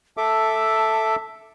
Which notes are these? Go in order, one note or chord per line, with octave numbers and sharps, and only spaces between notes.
A4 E5 A5 D6